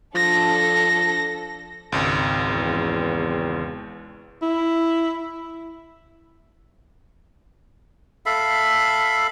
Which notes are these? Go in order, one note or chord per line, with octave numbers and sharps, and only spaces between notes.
F3 D4 A4 A#6
G#1 C#2
E2
E4
A4 E5 F5 B5